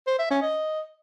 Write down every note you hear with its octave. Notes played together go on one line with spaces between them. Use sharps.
C5
E5
C#4
D#5